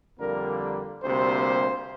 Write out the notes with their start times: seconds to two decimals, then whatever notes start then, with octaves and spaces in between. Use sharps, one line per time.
0.19 F2 D3 G3 A#3 A#4
1.03 D2 C3 G3 A#3 C5